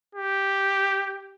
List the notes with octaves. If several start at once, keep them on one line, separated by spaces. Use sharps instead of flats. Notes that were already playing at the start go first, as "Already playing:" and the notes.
G4